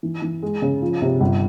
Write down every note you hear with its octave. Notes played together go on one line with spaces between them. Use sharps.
E3
E3
G#3
C#3
F3
C3
G1